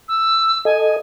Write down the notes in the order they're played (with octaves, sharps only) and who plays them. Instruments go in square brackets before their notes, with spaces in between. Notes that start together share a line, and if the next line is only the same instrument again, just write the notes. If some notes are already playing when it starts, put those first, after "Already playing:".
[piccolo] E6
[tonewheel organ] A4 D#5 [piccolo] G#5